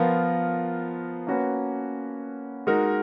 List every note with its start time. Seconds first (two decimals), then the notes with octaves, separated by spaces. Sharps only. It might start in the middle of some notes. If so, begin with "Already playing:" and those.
Already playing: F3 B3 F4 A#4
1.27 A#3 C#4 F#4 B4
2.67 G#3 D#4 F#4 A#4